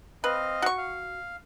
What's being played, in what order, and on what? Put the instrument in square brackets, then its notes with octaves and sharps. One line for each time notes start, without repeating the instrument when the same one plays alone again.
[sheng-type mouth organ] C4 D#5 F5 [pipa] B4
[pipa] F#4 C#6
[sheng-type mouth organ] F5